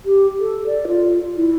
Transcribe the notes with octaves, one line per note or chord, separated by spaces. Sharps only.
G4
A4
D5
F4
E4